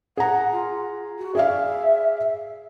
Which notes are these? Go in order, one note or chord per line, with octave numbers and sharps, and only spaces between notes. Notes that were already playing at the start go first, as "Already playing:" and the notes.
G#4 F#5 A#5
F4
F#4
G#4 D5 E5 F5